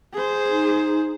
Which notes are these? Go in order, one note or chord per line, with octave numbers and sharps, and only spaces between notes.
G#4 C5
D#4